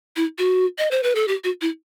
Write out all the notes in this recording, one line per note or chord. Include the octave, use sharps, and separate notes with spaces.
E4
F#4
D#5
C5
B4
A4
G4
F#4
E4